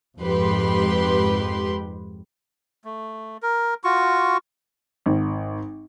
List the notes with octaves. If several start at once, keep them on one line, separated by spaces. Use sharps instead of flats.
F2 G#2 G4 B4 C6
A3
A#4
F4 F#4 C#6
G#1